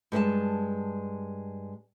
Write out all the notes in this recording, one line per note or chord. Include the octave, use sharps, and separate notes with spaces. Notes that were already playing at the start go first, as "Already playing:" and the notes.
G2 G#3 A#4 A5